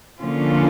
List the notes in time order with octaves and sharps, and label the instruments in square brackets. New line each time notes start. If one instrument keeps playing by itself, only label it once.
[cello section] D3 F3 A#3 C#4 F4